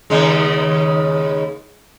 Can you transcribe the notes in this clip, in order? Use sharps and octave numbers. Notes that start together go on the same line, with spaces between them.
D#2 C#3 G#3